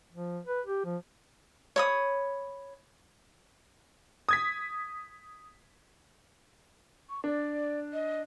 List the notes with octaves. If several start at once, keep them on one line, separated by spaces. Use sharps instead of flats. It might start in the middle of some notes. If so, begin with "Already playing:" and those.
F3
B4
G4
F3
C#5 B5 D#6
D#6 G#6 B6
C#6
D4 D5
D#5